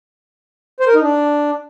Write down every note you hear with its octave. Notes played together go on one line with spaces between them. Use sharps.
C5
A#4
D#4
D4